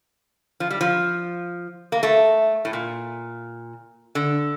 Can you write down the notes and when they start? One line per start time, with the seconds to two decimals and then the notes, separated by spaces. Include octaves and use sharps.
0.60 F3
0.70 G3
0.81 F3
1.92 A#3
2.03 A3
2.65 A2
2.73 A#2
4.15 D3